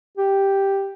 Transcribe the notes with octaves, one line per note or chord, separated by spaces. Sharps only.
G4